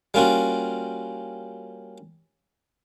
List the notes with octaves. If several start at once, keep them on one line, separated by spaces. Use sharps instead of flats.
G3 A#3 C#4 F4 F#4